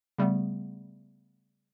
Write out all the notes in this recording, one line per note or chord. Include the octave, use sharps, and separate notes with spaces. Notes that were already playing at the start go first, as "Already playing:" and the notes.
C#3 G3 A3 B3